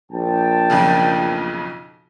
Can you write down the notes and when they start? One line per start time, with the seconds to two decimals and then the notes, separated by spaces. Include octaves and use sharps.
0.12 A#1 G5 A5
0.70 B1 F2 C#3